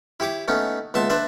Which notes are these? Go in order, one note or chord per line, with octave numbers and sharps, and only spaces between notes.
E4 G4 C#5 D6
A3 B3 C#4 D#4
C#2 B3 E5 A5 C6
D4 B4 C5 D5 E5